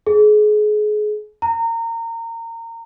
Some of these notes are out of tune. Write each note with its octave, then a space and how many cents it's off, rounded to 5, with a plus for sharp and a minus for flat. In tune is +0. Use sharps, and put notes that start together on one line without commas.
G#4 +30
A#5 -25